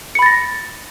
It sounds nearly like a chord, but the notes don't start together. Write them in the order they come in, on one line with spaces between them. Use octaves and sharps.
C#7 B5 A6 A#6